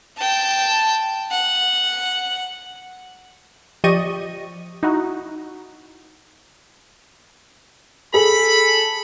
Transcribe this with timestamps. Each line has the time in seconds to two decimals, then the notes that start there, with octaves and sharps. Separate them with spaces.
0.18 G5 A5
1.31 F#5
3.84 F3 G4 D5 D#5 C#6 D#7
4.83 D#4 E4 F#4
8.14 G#4 A4 B5